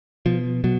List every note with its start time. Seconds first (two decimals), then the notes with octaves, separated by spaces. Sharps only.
0.26 B2 F3
0.64 B2 F#3